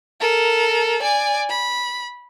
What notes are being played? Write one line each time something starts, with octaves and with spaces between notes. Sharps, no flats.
A4 A#4
D5 G#5
B5